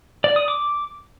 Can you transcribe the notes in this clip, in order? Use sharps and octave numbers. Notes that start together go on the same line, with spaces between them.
D5
D#6
D6